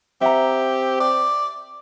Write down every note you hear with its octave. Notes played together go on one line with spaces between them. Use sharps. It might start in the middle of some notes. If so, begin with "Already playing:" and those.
C4 G4 E5 F#5 A#5
D5